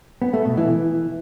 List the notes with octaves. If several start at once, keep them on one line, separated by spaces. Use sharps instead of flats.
B3
A3
B2
E3